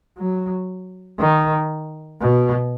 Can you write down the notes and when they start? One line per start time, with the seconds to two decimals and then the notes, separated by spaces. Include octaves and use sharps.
0.18 F#3
1.19 D#3
2.21 B2